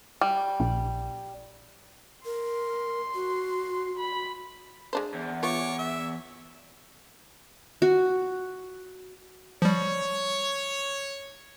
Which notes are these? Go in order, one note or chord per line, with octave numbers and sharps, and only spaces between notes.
G3
A#1
A#4 C6
F#4
B5
G#3 D4 C5
E2
B3 F4 C#5 C#6 D6
E5
F#4
F3 G3 C#5